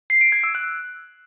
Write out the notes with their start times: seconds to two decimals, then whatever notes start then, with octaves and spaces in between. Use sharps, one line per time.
0.10 C7
0.21 D7
0.32 G#6
0.44 E6
0.55 F#6